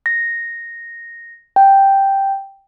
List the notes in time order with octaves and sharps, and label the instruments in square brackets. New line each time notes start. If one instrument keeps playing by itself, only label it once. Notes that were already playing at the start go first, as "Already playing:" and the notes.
[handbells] A#6
G5